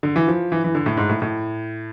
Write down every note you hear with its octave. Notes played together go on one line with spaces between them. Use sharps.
D3
E3
F3
E3
E3
D3
A2
G#2
A2
A2